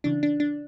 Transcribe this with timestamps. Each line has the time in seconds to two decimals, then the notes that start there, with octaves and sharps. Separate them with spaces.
0.04 C#3 E3 D4
0.23 D4
0.40 D4